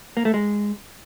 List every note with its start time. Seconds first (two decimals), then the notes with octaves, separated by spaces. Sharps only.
0.17 A#3
0.25 A3
0.34 G#3